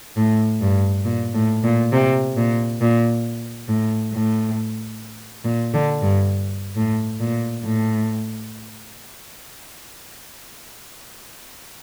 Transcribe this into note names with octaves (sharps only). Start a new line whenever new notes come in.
A2
G2
A#2
A2
A#2
C3
A#2
A#2
A2
A2
A#2
D3
G2
A2
A#2
A2